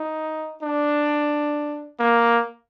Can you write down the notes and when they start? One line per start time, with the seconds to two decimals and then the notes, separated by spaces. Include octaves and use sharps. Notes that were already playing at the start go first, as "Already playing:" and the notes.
Already playing: D#4
0.62 D4
2.00 A#3